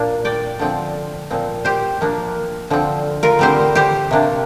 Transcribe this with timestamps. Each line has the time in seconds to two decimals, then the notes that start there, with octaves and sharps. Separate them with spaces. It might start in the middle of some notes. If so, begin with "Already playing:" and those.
Already playing: A#2 A#3 D4
0.25 D5 G5
0.59 D3 F3 C4
1.30 A#2 F3 C4
1.65 G4 C5
2.01 F3 A#3 D4
2.70 D3 F3 C4
3.23 F4 A#4
3.39 D3 G3 C4 G4 C5
3.75 G4 C5
4.11 C3 A#3 D4